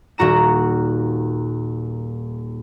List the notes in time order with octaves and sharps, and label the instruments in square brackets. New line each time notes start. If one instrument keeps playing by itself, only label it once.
[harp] D#1 A#2 F#4 A#5 E7